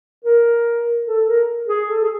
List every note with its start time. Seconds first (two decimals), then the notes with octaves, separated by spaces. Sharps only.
0.24 A#4
1.06 A4
1.27 A#4
1.68 G#4
1.88 A4
2.02 G#4